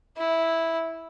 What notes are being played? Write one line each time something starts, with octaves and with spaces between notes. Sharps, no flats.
E4